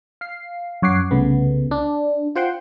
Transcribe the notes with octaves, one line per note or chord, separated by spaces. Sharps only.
F5 C7
F#2 C#5 F#5 D6 C7
C2 C#3 A3 B3
D4
F4 C5 F#5 G5 C6